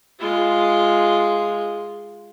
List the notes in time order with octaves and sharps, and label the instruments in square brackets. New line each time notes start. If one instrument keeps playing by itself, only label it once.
[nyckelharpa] G#3 F4